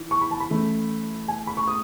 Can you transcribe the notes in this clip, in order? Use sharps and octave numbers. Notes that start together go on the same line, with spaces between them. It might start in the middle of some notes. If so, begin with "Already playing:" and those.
Already playing: E3
C#6
B5
A5
B5
E3 A3 C#4
G#5
B5
C#6
D#6